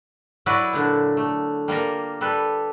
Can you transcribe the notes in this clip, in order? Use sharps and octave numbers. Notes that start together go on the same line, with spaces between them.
F#3 E4 F#4 B4 D5
A#2 D3
A3
G3 A#3 F4 A#4
G3 A4 B4